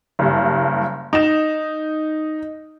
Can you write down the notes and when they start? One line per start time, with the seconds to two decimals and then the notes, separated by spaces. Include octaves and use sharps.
0.19 F#1 G2
1.13 D#4 E7